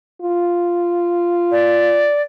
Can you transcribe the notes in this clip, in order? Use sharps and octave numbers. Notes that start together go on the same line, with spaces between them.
F4
D5